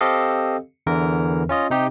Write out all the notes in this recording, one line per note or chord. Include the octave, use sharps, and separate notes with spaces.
C4 G4 A4 D#5 F5
E2 D3 E3 A#4
C#4 F4 D#5
C3 D#4 G4